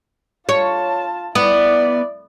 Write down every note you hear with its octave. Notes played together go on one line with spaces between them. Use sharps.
F4 C#5 A5
B3 E4 D5